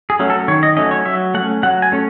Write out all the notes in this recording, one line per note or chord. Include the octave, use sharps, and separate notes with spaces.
G#4
F#3 A3 C#4
A4
D#3 C#5
D#5
F#3 A3 C#4 D#5
C#5
F#3 E5
A3 C#4 F#5
F#3 F#5
G#5
A3 C#4